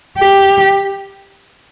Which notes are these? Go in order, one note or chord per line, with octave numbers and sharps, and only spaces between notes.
G4